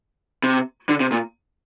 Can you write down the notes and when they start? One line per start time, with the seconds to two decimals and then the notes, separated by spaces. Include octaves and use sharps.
0.44 C3
0.89 D3
1.00 C3
1.12 A#2